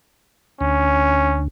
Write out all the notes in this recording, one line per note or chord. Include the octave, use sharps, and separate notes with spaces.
D2 C#4